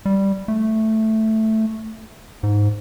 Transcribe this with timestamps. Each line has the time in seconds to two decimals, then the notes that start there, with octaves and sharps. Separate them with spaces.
0.06 G3
0.48 A3
2.43 G#2